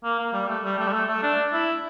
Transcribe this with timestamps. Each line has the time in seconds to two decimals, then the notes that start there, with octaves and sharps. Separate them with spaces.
0.04 A#3
0.19 A#3
0.33 G3
0.48 A3
0.64 G3
0.79 A3
0.88 G3
0.93 A3
1.08 A3
1.23 D4
1.53 E4